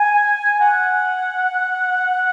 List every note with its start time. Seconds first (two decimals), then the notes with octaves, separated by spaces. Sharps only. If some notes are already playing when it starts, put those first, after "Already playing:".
Already playing: G#5
0.60 F#5